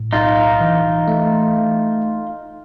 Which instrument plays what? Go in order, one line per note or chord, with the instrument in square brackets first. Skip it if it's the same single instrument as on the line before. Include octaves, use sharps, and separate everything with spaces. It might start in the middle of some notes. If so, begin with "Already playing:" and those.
Already playing: [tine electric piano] A2
[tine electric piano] B1 [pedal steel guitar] D#4 F4
[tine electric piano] E3
A3